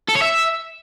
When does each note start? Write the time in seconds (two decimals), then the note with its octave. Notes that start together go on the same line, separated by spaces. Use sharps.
0.08 A4
0.15 C#5
0.22 E5